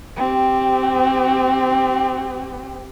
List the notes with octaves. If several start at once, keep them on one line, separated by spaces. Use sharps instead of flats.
C4 G4